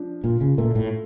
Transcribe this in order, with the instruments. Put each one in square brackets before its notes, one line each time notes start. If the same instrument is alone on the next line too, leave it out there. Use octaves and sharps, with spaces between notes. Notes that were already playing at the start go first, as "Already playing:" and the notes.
Already playing: [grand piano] F3 D4
[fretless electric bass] A#2 [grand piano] F4
[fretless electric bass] C#3
[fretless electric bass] A#2 [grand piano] A3
[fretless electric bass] A2